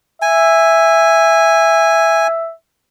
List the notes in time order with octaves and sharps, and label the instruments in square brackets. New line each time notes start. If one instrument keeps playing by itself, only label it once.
[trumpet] E5 [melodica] G#5